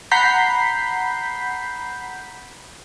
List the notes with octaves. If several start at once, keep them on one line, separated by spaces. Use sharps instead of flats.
F#5 A#5 B5 G6 B6 C7